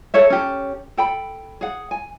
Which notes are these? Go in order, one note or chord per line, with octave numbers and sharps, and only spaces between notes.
A4 A#4 C#5 E5
C#4 G4 A4
A4 G5 B5
G#4 F#5
G#5